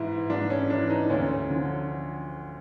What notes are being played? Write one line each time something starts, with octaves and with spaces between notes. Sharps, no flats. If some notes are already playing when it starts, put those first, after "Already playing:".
Already playing: G#2 E3 D#4 E4
G#2 D4
C#4
E3 D4
D#4
D2 C#4
D3 F3